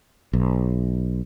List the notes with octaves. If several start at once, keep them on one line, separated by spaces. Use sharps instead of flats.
B1